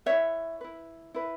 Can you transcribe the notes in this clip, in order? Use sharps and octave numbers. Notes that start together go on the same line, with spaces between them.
E4 B4 C#5 E5
E4 B4
E4 B4